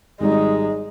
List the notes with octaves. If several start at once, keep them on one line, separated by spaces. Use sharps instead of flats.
G#1 G3 G#3 D#4